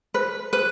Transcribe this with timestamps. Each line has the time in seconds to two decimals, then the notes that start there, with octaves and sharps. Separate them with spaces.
0.14 B4
0.53 B4